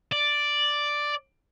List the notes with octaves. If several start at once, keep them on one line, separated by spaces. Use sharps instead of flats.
D5